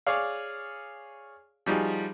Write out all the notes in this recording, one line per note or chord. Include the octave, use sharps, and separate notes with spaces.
G#4 C#5 D5 F5
F3 G3 D#4 F#4 G#4